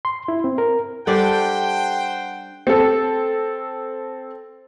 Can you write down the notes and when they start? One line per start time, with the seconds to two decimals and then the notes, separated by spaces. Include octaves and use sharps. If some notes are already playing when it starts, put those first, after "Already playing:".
0.05 C6
0.28 E4
0.44 C4
0.58 A#4
1.07 G3 D4 A4 C5 D5 F#5 G5
2.67 C4 A4